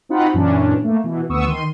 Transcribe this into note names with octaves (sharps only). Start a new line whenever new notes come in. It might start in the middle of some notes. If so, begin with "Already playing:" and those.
C4 D#4 F4 F#4 F#5 B5
F#2 A#2 E3 C#4 D4
A3 A#3
B2 E3
D2 B3 C#6 D#6 E6
D#3 C6 D#7